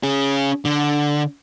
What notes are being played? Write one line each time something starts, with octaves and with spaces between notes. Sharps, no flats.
C#4 G#4
D3